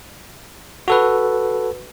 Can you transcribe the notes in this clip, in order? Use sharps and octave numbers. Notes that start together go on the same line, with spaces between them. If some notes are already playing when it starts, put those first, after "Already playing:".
F#4 A4 B4